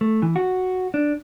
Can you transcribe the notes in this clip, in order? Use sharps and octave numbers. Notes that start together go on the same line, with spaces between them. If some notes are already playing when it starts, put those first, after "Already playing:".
A3
E3
F#4
D4